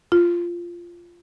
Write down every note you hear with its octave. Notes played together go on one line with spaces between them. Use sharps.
F4